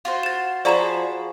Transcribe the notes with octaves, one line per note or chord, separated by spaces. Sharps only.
F4 F#4 C5
A6 E7
F3 F#4 G#4 D5 A#5 B5 E7